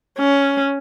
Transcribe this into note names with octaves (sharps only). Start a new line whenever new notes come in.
C#4